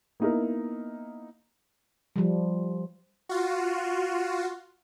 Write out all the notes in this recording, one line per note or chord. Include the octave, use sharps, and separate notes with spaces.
A#3 B3 D#4 E4 A#4
F3 G3
F4 F#4